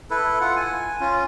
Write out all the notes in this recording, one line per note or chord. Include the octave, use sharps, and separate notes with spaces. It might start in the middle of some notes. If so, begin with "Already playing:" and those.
E4 A4 B4
F4 F#5
G#5
C#4 F4